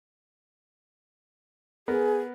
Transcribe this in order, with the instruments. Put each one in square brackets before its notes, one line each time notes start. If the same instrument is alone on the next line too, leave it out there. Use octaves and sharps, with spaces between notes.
[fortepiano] B3 A#4 [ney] G#4